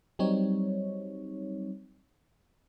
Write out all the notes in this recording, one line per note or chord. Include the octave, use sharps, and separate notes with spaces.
F#3 G3 C4 D#4 C#5